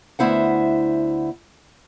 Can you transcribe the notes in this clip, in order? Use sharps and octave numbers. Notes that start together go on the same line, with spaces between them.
D2 B3 E4 C5 F#5